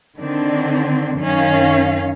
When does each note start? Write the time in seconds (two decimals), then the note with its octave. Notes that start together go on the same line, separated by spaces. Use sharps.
0.19 D3 D#3 C4 D4
1.18 F#2 D#3 C#4 F5